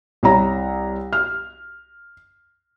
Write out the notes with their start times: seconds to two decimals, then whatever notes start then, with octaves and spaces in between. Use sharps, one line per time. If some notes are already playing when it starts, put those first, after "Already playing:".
0.23 C2 C#5 A#5
1.13 F6